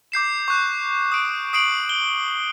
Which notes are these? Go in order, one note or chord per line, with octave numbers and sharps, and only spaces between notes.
D6 G6 C7 E7
C#6 F#6
D#6 D7
D#6 C7 D7 F#7
G7